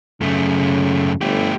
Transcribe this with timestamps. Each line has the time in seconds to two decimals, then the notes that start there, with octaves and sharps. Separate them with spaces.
0.21 F#2 C#3 A3
1.21 G1 A3 G4